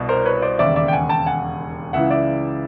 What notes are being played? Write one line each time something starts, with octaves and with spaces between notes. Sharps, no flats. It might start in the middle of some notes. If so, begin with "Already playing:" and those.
Already playing: C2 B2
A#4 C5
B4 C#5
C5 D5
E1 D#2 C#3 D5 E5
D5 E5
G5
F#5 G#5
G5 A5
F#5 G#5
C#2 C#3 E3 E5 F#5
D5 E5